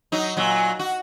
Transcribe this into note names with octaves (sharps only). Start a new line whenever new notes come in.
F#3 D#4
A#2 F#3
F#4